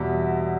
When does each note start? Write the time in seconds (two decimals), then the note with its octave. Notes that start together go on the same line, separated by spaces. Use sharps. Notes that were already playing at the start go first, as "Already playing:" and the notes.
Already playing: E2 B2 G3 B3 E5